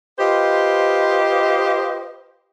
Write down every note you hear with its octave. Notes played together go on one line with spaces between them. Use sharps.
F4 G4 B4 C5 D#5